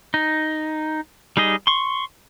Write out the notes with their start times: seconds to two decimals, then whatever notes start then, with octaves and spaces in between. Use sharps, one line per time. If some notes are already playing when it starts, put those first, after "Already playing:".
0.14 D#4
1.37 G3 D#4 G#4 D#5
1.67 C6 C#6